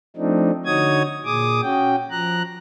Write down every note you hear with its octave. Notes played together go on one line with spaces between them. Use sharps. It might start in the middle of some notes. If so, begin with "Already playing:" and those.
F3 A3 C4 D4 D#4
D3 D#4 F#4 C#5 D#6 G#6
A#2 G#4 D6 D#6
C#4 F#4 G5
F3 A#5 F#6